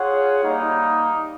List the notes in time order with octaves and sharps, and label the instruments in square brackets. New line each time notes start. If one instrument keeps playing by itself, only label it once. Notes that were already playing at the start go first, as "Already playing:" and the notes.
Already playing: [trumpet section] F4 G#4 C#5 F#5
G3 A#3 D#4